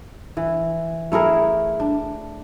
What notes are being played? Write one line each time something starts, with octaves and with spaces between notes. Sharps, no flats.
E3
A3 E4 G#4 A#4
D4